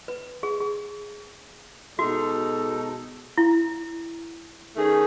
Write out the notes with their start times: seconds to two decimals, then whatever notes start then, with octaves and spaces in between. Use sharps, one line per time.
0.08 B4
0.43 G#4
0.60 G#4
1.99 B2 G#3 D#4 F#4 A4
3.38 E4
4.75 D#3 A3 C#4 G#4